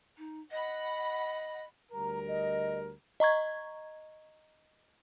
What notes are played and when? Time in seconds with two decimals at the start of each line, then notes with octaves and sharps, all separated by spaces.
0.18 D#4
0.51 D#5 F#5 B5
1.92 D2 G3 A#4 A#5
2.28 D#5
3.20 D#5 A#5 C#6 G#6